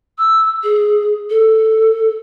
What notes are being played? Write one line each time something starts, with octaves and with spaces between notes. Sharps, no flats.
E6
G#4
A4